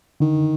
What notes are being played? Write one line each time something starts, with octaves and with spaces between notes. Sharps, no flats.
D3 D#3